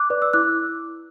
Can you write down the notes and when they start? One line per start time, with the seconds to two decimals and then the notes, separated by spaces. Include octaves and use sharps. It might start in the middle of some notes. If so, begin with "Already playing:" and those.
Already playing: D6 F#6
0.10 B4 D5
0.22 E6
0.33 E4 D6 F#6